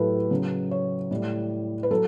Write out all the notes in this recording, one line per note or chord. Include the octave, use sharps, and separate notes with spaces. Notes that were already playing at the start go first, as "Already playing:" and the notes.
Already playing: A2 F#3 G4 A4 B4
C#3 F#3
C#5
A2 G3
B4
F#3 A4